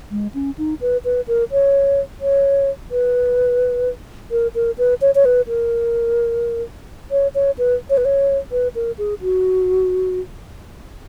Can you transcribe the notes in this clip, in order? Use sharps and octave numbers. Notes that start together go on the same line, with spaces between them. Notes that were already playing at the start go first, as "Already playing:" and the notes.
G#3
C#4
D#4
B4
B4
A#4
C#5
C#5
B4
A#4
A#4
B4
C#5
C#5
B4
A#4
C#5
C#5
B4
C#5
B4
C#5
B4
A#4
G#4
F#4